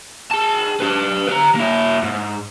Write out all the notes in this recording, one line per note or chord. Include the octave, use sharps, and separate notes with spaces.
G#4 A5
G4 B4
G4 A#5
A#3 E4
G#2